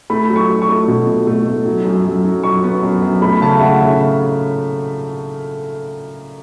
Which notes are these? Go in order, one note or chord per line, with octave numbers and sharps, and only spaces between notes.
A3 B5
F#3
C#6
F#3
C#6
A3
B2
B2
A3
A3
F#3
F#2
F#2
F#3
F#2 C#6
B3
F#2
F#2
A3 B5
C#3 A5
E5
A3 F#5
C#3 E5